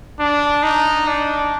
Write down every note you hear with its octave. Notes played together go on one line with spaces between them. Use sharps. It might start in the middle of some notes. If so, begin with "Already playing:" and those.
D4
D#4
D4